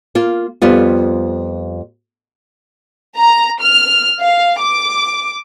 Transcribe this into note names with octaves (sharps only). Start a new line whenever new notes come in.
A#3 F4
F2 G3 B3 F4
A#5
F6
F5
D6